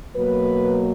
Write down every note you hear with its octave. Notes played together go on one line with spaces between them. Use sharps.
B2 F#3 A#3 B4